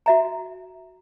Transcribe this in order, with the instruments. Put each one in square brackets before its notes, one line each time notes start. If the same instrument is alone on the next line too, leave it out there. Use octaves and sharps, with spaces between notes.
[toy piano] F#4 E5 A#5